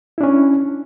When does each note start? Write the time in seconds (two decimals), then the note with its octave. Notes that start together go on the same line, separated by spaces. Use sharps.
0.18 E4
0.21 D4
0.23 C#4